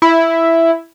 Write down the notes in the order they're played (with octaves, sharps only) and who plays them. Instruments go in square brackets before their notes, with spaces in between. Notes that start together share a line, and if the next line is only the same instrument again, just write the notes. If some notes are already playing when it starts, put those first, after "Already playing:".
[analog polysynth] E4